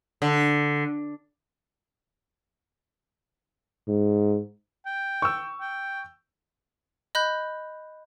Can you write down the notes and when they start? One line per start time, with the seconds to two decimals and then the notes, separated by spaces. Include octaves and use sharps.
0.22 D3
3.88 G#2
4.86 G5
5.22 C#6 E6
5.61 G5
7.15 D#5 B5 F#6 G6